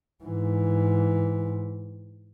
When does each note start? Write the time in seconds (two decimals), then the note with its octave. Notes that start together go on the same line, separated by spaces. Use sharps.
0.24 G#2 E3